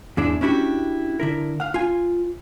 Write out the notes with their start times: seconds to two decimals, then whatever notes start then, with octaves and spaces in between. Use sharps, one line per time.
0.17 E2 G#2 G#3 D4 E4 D5
0.41 C#4 D4 E4 F#4 G4
1.20 D3 E4 A#4
1.60 F5 F#5
1.74 F4 G#5